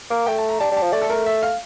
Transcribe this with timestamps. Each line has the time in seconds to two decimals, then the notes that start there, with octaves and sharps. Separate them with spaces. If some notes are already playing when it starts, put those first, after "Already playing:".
0.10 A#3 A#4
0.26 A3 G5
0.38 A5
0.49 A#5
0.60 G3 A5
0.72 G3
0.77 A5
0.82 F3
0.92 A3 D5
1.02 A4
1.10 A#4
1.26 E5
1.43 F5